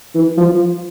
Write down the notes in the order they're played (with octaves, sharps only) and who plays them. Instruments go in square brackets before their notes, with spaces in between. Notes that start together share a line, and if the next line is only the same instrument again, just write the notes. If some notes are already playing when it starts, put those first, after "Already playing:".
[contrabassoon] E3
F3